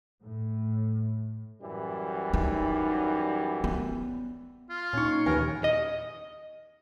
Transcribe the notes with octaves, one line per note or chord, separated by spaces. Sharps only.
A2
F#2 E3 G3
D#4
B3
F4
A#2 C#4 D#4 C#6
D#2 A#4 B4 G5 G#5
D#5